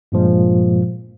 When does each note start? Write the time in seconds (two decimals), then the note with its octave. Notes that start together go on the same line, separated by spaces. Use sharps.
0.12 G2 A#2 F3 G#3